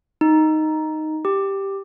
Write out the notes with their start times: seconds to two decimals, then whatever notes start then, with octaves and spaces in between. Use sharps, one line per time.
0.21 D#4
1.25 G4